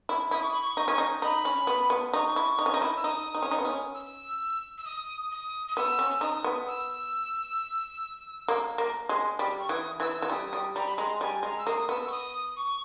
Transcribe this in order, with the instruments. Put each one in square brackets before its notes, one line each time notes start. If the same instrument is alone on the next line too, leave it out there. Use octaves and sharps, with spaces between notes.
[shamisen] E4
[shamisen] E4 [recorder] D#6
[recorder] C#6
B5
C#6
[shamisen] D#4
C#4
D#4
[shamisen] D#4 [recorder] B5
[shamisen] C#4
B3
B3
[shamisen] D#4 [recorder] C#6
[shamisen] E4
D#4
C#4
D#4
E4
[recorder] E6
[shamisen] D#4 [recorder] D#6
[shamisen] D#4
C#4
D#4
B3
C#4
[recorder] E6
E6
D#6
D#6
D#6
[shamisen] B3 [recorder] E6
[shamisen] C#4
[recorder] E6
[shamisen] D#4 [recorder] D#6
[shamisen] B3
[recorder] E6
[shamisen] A#3
A#3
G#3
G3
[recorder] C#6
[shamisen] E3 [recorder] D#6
[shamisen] E3 [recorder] E6
[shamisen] E3 [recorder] E6
[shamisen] G3 [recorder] D#6
[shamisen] G3
[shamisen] G3 [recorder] A#5
[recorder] B5
[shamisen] G#3 [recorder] A#5
[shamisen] G3 [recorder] G#5
[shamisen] G#3 [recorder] A#5
[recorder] E6
[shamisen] A#3 [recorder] D#6
[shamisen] B3 [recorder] E6
[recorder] C#6
D#6
C#6